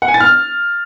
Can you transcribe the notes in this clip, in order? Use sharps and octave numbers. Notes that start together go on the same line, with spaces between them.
F#5
G#5
A6
F6